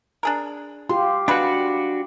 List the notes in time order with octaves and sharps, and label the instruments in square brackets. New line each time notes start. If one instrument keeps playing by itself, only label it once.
[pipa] D4 G#4 A#4
[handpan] F4 G4 [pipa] C6
[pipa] G3 G#3 B4 [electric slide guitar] D4 F#4